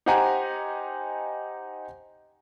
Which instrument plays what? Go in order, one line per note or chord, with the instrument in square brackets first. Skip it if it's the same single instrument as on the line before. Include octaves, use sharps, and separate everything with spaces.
[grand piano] D#4 G4 C5 F#5 G#5 A#5